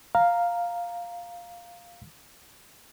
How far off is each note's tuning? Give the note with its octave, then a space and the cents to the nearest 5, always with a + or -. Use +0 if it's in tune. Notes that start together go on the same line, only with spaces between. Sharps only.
F5 +0 A#5 -5